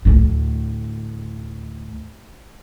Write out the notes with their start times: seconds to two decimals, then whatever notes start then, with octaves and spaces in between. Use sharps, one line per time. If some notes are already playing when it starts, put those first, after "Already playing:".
0.05 D2 A2